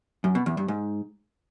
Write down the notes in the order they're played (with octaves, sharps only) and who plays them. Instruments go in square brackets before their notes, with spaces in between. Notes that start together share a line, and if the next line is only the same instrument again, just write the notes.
[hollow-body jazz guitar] F#2
B2
E2
G2
G#2